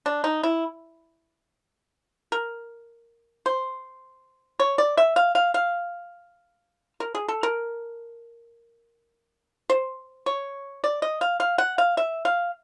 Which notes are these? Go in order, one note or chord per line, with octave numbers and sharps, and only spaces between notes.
D4
D#4
E4
A#4
C5
C#5
D5
E5
F5
F5
F5
A#4
G#4
A4
A#4
C5
C#5
D5
D#5
F5
F5
F#5
F5
E5
F5